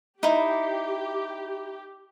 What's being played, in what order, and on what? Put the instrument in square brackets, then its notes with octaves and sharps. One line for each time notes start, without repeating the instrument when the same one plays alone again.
[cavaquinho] D#4 E4 [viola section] G4